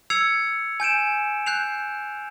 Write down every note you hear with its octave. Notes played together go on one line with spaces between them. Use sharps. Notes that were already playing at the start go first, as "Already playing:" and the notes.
E6 G#6 C7 C#7 F7
G#5 G6 D7 E7
F#6 G6 C7 F7